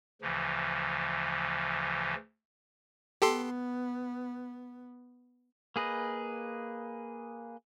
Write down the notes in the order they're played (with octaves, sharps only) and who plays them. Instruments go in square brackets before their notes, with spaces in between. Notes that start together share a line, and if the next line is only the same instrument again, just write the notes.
[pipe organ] D2 C#3 E3 F3
[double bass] B3 [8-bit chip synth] G4 A4 C6
[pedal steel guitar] A#3 G#4 B4 D#5